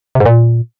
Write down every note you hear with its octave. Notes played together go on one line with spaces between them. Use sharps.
C3
G#2
A#2